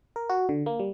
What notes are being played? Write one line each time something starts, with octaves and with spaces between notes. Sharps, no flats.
A#4
F#4
D3
A#3
G3